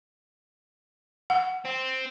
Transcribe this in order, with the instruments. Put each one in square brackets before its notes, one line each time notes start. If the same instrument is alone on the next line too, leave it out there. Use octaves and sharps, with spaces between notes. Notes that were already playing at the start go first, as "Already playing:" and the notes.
[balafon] F#5
[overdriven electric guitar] C4